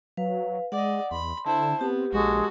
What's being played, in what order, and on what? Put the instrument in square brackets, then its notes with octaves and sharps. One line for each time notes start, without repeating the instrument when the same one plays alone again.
[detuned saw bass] F#3 [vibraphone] B4 F5
[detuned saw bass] G#3 [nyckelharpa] D5 D#5 [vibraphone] F#5
[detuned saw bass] E2 [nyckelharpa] B5 [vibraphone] C6
[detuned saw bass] D3 [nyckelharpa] E4 C5 [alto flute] A5
[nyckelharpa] B3 [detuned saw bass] C4 [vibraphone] G4
[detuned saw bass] A#1 [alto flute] G#3 [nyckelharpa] F#4 A4